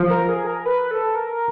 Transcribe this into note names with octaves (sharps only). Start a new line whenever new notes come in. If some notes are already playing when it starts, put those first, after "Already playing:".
Already playing: F3
A#4
G#4
A#4
B4
A4
A#4